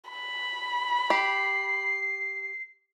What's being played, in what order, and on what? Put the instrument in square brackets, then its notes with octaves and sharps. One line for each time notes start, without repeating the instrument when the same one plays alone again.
[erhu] B5
[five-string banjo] G4 [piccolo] C7